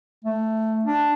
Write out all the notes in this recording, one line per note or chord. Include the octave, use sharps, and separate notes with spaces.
A3
D4